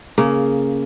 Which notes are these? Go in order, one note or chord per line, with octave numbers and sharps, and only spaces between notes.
C#3 A#3